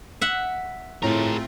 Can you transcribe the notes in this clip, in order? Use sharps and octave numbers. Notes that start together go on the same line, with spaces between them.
E5 F#5
A2 A3 C4 F4 G#4 A#4